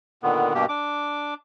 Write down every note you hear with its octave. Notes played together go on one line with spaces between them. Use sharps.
A#2 D3 D#3 B3
G2 B2 A#3 G4
D4 D6